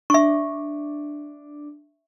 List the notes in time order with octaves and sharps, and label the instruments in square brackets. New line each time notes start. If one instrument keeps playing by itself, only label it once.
[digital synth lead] D4 [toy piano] E5 C#6